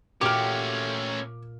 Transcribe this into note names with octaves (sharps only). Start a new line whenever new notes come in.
A#2 A3 C#4 F#4 G4 D6 F6